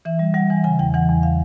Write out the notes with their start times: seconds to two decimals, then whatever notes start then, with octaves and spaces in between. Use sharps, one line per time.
0.05 E3 E5
0.19 G3
0.34 G3 F#5
0.50 E3 G#5
0.64 C#3 G#5
0.79 E2 G5
0.94 E3 F#5
1.09 E2
1.23 F5